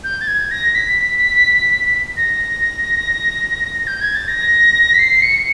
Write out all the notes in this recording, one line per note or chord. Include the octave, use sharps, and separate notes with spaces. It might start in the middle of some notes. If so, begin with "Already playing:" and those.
G6
A6
G#6
A#6
B6
A#6
G6
G#6
A6
A#6
B6
C7
C#7